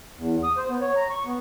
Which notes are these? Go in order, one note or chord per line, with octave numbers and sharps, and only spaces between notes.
E2
D#6
C5
B3
C#5
A#5
C#6
B3